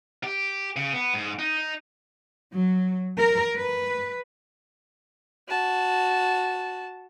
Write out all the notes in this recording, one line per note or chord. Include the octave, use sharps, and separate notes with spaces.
G4
C#3
B3
G#2
D#4
F#3
A#4
B4
F#4 A5